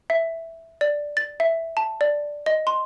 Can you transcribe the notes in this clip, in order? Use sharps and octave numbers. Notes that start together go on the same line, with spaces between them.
E5
D5
A6
E5
A5
D5
D#5
C6